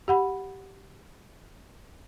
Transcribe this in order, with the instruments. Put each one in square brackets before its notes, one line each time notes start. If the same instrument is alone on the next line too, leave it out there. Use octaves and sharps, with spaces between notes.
[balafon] G4 F#5 B5